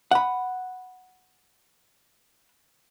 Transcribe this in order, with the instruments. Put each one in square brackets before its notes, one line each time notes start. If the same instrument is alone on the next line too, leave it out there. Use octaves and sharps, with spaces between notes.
[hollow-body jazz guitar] F#5 B5